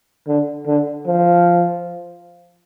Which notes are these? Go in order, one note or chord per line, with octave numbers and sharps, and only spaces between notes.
D3
D3
F3